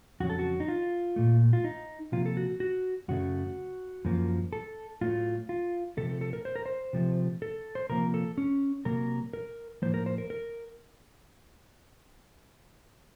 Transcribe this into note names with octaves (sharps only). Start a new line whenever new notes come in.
F2 C#3 F#3 F#4
A4
F#4
D#4
F4
A#2 A3
F4
D#4
C3 F3 A#3 F4
A4
F#4
F#4
F#2 C#3 A3 F#4
F#2 F3 A#3
A4
A2 F#3 A3 F4
F4
C3 F3 A3 A4
A4
A4
A#4
C5
A#4
C5
C3 F3 A3
A4
C5
C3 F3 A#3 A#4
A4
C#4
C3 F#3 A#3 A#4
A#4
A2 F3 A#3 C5
A#4
C5
A#4
A#4